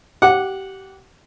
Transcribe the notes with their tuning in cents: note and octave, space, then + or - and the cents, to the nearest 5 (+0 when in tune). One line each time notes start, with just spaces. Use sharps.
G4 -25 F#5 -10 D6 +0